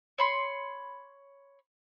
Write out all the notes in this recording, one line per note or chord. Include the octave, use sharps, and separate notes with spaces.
C#5 B5 C6